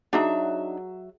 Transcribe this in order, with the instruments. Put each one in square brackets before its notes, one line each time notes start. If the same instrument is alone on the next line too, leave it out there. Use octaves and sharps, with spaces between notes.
[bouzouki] F#3 E5 [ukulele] D4 D#4 [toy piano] F#4 G#4 F#5